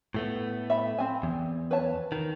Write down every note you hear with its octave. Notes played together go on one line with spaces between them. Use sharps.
A2 A3 B3
E5 B5
C4 G#5
E2
B4 C#5 A5
D#3